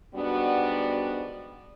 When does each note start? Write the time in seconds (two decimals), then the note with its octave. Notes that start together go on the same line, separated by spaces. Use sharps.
0.15 G#2 G3 B3 D4 F#4